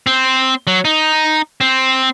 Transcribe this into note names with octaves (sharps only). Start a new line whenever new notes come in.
C4
F#3
D#4
C4